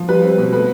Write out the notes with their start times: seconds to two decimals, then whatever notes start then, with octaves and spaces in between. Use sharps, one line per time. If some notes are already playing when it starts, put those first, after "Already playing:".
Already playing: F3
0.09 G3 B4
0.23 C4
0.38 B2
0.53 A3 B4